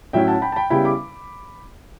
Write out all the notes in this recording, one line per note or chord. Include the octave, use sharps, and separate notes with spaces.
A2 F#3 C#4 E4 E5 G5
F#5 A5
G5 B5
A5
G5 B5
C#3 G3 B3 E4 G5 B5
B5 D6